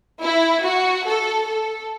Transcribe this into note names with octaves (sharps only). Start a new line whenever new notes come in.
E4
F#4
A4
A4